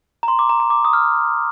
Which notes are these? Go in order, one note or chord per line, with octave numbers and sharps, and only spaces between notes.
A#5
C6
D6
A#5
A#5
D6
D#6
F6